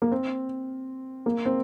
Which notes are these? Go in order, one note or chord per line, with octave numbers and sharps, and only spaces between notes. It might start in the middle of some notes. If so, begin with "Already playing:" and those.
A#3
C4
A#3
C4